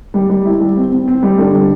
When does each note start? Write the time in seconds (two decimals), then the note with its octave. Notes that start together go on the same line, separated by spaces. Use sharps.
0.14 G3
0.30 G3
0.45 E4
0.60 G3
0.77 C4
0.92 C4
1.08 C4
1.23 G3
1.38 D3
1.53 G3